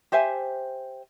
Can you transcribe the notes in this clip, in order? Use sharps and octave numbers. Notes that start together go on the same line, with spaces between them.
G4 C5 E5 G#5